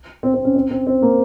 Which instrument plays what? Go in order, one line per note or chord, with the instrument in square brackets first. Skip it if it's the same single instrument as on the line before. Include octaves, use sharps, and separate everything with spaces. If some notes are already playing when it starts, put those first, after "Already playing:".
[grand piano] C4
C4
C#4
C4
C4
C4
A#3